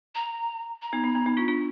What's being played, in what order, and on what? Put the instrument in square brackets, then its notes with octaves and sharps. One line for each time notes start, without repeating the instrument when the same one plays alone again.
[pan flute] A#5
A#5
[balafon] B3 D#4
B3 D#4
B3
B3 D#4
D4 F4
D4 F4